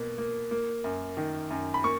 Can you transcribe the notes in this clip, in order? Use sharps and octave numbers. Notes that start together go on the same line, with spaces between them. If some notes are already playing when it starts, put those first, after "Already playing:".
Already playing: B2 A#3
A#3
A#3
F#2
D#3
F#2
B5
A#3 C#6